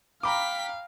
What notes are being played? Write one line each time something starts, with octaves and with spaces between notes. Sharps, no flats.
F5 G5 A#5 B5 D6 B6